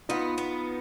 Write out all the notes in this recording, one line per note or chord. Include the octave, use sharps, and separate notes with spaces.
B3 D#4 F4
B3